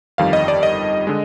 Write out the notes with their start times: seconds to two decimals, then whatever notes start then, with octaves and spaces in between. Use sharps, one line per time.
0.18 G1 F2 D#3 G3 F5
0.33 D#5
0.48 D5
0.63 D#5
1.07 D3 G#3